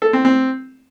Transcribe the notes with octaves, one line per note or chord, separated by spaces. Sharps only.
A4
C4
C4